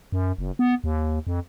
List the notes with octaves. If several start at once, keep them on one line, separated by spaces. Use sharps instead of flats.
F#2
F#1
B3
D#2
F2